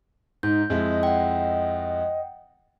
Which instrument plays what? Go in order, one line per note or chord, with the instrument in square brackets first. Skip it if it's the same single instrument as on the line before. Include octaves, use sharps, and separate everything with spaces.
[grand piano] G#2 [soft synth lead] D#4 [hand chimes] G6
[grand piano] F2 G#3 E4 [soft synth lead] D#5
[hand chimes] F#5 G5